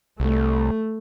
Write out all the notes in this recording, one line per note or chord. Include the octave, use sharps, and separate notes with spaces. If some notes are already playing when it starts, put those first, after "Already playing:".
C2 A3